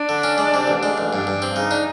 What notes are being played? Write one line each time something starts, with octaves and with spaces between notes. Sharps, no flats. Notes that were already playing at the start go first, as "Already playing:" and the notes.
Already playing: D4
D3
C#4
G#3
C3
A1
G#3
A1
G2 D4
G2
C4
C#3 D#4
D4